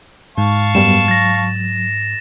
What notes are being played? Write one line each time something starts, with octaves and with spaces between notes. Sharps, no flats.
G#2 F5 A5 C#6
F#2 G3 B3 E7
F#3 A6 A#6